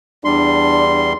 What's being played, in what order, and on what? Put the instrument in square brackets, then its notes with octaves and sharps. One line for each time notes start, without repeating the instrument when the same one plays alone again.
[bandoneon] E2 G3 C6 [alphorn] D4